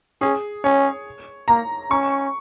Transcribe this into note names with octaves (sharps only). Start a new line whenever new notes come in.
C#4 G#4
C#4 C#5
A#3 A#5
C#4 C#6